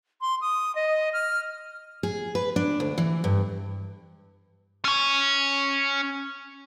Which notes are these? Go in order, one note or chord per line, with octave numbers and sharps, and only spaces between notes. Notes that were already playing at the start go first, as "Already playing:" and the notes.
C6
D#6
D#5
F6
G#4
B4
D4
D2
E3
G2
C#4 C#5